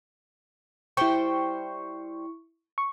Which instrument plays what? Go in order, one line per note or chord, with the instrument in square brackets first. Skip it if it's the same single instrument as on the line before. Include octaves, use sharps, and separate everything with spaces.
[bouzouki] G3 C5 G5 [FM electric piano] E4 C#6
[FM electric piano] C#6